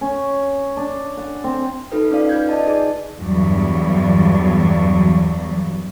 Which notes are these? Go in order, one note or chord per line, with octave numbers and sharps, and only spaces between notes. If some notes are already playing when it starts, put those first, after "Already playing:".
C#4
D4
F#5
C4
D#4 F4 A4 B4
C#4 D#4 D5 F5
F4 B4 G6 G#6
D5 D#5 A5
D#4 G#4 D5
E2 G2 F#3